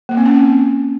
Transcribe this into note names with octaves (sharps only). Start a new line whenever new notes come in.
A#3
C4
C#4